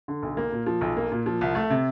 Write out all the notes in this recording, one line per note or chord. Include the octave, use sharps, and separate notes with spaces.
D3
B1
A#3
A#2
F3
B1
A#3
A#2
F3
C2
A3
C3